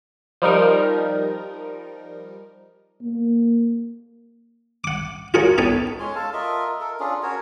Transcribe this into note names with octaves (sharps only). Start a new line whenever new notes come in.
F3 G3 D#4 A#4
A#3
F#5 D6
F4 F#4 G#4 A#4 C#5 F#5
B3 D#4 A4 C#5 G5
G#3 C#4 C#5 C6
A4 F5 A5
F4 A#4 D#5 E5
A4 A#4
C#4 D4 F4 G#4
C#4 F#4 A#4 C#5